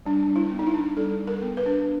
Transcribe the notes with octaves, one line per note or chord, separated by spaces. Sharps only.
G3 D4
G3
E4
B3
D#4
E4
D4
G3 A4
G3
A#4
B3
B4
D4